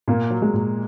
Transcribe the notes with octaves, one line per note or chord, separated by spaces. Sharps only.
A#2 A#3
F#3
G#3
A#2